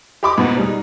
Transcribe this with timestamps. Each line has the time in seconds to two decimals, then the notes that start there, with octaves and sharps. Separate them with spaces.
0.23 G4 D#5 B5 C#6 D6
0.38 G#2 B2 B3 D#4 F#4
0.57 G3 G#3 D#4